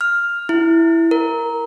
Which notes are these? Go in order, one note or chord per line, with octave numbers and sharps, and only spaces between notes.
F6
E4
A#4